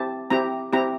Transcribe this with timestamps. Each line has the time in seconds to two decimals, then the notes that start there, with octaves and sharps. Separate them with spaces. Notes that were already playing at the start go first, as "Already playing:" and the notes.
Already playing: C4 E4 G4 A5
0.30 C4 E4 G4 A#5
0.73 C4 E4 G4 A#5